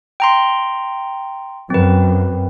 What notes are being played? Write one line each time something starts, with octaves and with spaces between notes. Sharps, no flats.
G5 A#5 C6
F#2 C4 B4